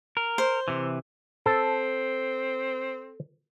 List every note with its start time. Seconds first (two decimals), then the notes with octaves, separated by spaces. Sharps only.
0.17 A#4
0.38 C5
0.68 C3 E3
1.46 C4 A4